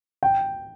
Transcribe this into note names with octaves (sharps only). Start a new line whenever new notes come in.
G5